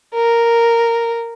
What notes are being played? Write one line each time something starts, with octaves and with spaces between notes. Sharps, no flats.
A#4